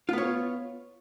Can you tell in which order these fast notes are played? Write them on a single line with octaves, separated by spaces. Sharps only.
F4 B3 C#5